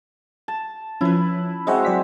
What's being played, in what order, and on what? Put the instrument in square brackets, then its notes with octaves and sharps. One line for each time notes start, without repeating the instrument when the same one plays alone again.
[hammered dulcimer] A5
[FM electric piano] F3 C#4 [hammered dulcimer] E4 B4
[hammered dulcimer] G#3 C4 F#4 [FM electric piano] D#5 E5 F#5
[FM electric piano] F#3 D5 B6